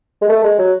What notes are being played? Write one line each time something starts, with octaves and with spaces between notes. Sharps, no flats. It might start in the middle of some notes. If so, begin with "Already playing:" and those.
G#3
A3
G#3
F#3